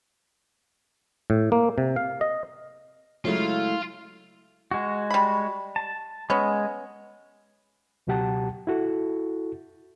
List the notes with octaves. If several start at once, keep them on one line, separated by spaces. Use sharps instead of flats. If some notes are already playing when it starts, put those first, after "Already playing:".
A2
A#3
C3
F5
D#5
C#3 F#3 G#3 A3 E4 F4
G#3 F#4
G3 B5
A5
G#3 B3 C#4
C#2 B2 F#3 G4 F#5 A5
E4 F#4 A4